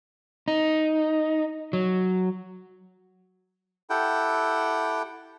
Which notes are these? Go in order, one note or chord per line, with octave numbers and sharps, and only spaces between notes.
D#4
F#3
E4 G4 A4 F#5 G5